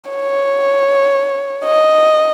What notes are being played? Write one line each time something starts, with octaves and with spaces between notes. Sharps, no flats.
C#5
D#5